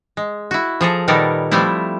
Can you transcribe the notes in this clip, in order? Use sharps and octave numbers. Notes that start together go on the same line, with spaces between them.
G#3
E4 F#4
F3 G#4 A4 A#5
A#2 D#3 G3 B3 A4 A#4
F3 G3 A3 C4 E4